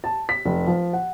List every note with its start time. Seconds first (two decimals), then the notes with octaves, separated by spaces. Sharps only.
0.04 A5
0.29 B6
0.46 F1
0.67 F3
0.93 F#5